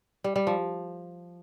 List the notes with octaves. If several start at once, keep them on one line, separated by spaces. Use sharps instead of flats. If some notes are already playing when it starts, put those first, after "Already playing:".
G3
G3
F3